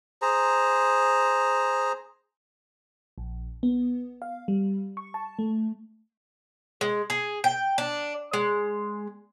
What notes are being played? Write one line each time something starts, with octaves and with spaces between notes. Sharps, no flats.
G#4 C5 A#5
A#1
B3
F5
G3
C#6
A5
A3
G#3
G#4
G5
D4
G#3